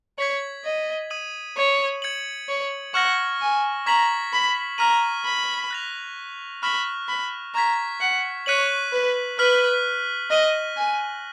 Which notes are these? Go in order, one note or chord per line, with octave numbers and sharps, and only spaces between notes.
C#5 G#6 B6 F#7
D#5
D#6 G#6 D#7 F#7
C#5
G#6 C#7 F#7
C#5
F#5 C#6 F6 A#6
G#5
A#5 C#6 G#6 B6 F#7
B5
A#5 F6 B6 D#7 F#7
B5
F#6 A#6 F7
B5 C#6 F6 A#6
B5
A#5 C#6 G#6 B6
F#5
C#5 F#6 B6 D#7 F#7
B4
B4 F6 B6 F#7
D#5 F6 A#6 D#7 F#7
G#5